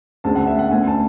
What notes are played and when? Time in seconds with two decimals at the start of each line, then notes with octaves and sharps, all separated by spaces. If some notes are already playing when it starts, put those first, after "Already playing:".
0.24 D2 D3 G#3 C#4 A5
0.35 F#5
0.47 E5
0.59 F#5
0.71 D2 D3 A3 C#4 G#5
0.87 A5